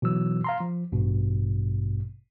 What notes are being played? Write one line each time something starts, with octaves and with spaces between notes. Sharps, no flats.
B2 E3 F#3 E6
F5 A#5 C6
F3
A1 G2 B2